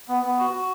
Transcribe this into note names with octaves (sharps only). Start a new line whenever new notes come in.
B3
B3
F#4
F#4